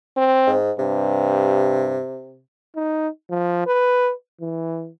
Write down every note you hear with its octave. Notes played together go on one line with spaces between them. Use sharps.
C4
G#2
G2 C3
D#4
F3
B4
E3